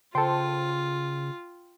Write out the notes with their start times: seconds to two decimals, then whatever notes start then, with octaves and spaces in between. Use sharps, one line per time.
0.15 C#3 F4 A4 C5 G5